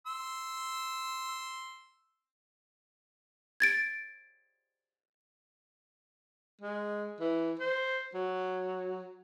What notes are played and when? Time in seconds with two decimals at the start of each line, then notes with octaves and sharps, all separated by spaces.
0.07 C6 E6
3.60 G#6 A6 D7
6.61 G#3
7.20 E3
7.59 C5
8.14 F#3